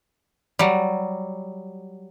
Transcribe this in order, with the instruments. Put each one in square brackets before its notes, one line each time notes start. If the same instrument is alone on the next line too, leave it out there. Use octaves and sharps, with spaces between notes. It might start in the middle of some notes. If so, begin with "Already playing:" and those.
[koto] F#3 G3